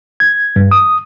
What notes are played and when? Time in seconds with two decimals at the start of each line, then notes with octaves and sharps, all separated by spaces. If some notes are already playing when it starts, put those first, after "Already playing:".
0.20 G#6
0.56 G2
0.71 D#6